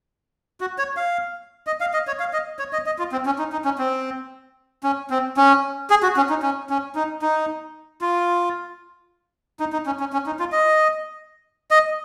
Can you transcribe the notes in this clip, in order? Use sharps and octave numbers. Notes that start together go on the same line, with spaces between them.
F#4
C#5
F5
D#5
F5
D#5
C#5
F5
D#5
C#5
D#5
D#5
F4
C4
C#4
D#4
D#4
C#4
C4
C#4
C4
C#4
G#4
F#4
C#4
D#4
C#4
C#4
D#4
D#4
F4
D#4
D#4
C#4
C#4
C#4
D#4
F4
D#5
D#5